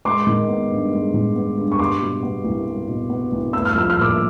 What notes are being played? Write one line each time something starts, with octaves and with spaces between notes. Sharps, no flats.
G#3 C6 D6
D#3
B3
G2
G#3
D#3
B3
G2
C#6
G3 C6 D6
B2
B3
C2
G3
B2
B3
C2
A3 E6
F6
F3 E6
F6
A#2 D6 E6